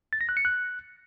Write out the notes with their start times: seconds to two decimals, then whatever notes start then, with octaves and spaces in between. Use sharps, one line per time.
0.13 A6
0.21 A#6
0.29 F#6
0.37 C#7
0.45 F#6